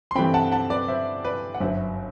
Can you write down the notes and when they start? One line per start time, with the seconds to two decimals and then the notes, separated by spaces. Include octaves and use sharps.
0.11 C6
0.15 G2 E3 A3 C4 G5 B5
0.34 F#5 A5
0.52 F#5 A5
0.70 B4 D5
0.88 C5 E5
1.24 B4 D5
1.55 F#5
1.60 G1 F#2 F#3 C5 E5